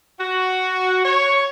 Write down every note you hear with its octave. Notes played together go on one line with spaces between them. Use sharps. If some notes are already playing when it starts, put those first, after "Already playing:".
F#4
C#5